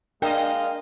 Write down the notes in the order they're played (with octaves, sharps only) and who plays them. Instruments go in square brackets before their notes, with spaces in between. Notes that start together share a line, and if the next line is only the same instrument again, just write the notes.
[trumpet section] G#3 F5 [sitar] D4 D#5 [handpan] A#4 [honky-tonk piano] G5